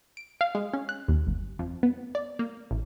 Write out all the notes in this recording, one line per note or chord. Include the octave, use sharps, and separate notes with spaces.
D7
F5
G#3
C#4
F#6
D#2
G1
F2
B3
D5
A#3
A1